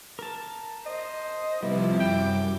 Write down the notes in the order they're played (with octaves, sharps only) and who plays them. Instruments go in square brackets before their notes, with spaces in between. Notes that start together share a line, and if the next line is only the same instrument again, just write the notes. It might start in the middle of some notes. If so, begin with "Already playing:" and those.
[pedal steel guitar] A#4 A5
[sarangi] C5 [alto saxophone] D#5
[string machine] C3 F3 [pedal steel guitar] G3 [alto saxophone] B3 [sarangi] E4
[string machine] F#2 D6 [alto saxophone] G5